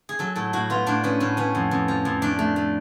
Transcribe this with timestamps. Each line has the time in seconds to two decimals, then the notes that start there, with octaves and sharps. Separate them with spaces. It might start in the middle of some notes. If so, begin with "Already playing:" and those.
0.09 G#4
0.19 F#3 A4
0.36 A2 A4
0.53 A2 F#4
0.70 B3 F4
0.86 A2 D4
1.04 B3 C#4
1.20 A2 C#4
1.37 B3 C#4
1.55 F2
1.71 F2
1.88 F3
2.05 F2
2.22 A3 D4
2.39 A3
2.56 A3